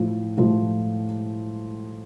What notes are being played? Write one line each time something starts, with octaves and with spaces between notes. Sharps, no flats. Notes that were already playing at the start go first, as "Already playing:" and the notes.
Already playing: A2 F3 A3
A2 F3 A3